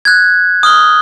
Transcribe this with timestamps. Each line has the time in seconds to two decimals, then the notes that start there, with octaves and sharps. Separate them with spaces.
0.05 F#6 G#6
0.63 D#6 F6 G7